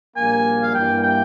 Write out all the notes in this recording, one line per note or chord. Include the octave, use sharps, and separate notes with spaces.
A#1 A#2 G3 A#3 G#5
F5
G2 E3 G3 A#3 E4 G5
G5